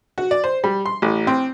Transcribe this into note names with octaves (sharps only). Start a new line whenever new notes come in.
F#4
D5
C5
G3
C6
A1
C4